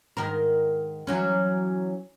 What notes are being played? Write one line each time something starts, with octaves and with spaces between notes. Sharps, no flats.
G#2 D#3 A#4
E3 F#3 C#4